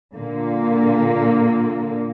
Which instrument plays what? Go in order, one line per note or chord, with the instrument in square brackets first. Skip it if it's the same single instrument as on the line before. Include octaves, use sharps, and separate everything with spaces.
[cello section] A#2 D3 A#3